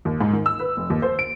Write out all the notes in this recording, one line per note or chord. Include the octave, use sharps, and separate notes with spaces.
D#2
G#2
D#3
E6
B4
F1
D#2
C5
D7